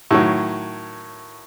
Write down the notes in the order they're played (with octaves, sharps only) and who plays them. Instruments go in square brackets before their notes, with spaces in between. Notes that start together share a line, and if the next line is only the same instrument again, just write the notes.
[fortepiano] A2 D#3 F#3